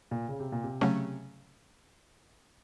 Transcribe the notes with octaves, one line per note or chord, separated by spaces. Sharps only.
A#2
C#3
C3
A#2
C3
C#3 F#3 A3 C#4